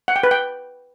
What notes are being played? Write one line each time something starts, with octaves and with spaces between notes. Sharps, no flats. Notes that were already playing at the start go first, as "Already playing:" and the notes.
F#5
G5
B4
G5